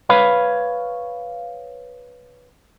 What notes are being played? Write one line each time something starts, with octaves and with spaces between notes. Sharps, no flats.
B4 C#5 F5 B5